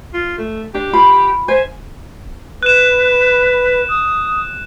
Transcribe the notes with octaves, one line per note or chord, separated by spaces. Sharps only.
F4
A3
D4 G4
F4 B5
C5 E5 G#5
B4 F#6 E7
D#6